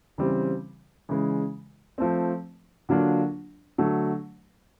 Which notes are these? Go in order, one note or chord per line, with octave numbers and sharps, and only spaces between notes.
C#3 E3 G3 C4
C#3 E3 G#3
F3 A3 C4
D3 F#3 A#3 D4 F4
D3 F#3 A3